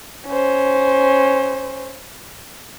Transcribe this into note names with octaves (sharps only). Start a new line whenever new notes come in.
C#4 C5